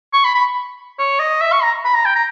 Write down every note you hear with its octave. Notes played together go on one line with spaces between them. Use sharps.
C#6
B5
B5
C#5
D#5
E5
C#6
A#5
B5
A#5
G5
A#5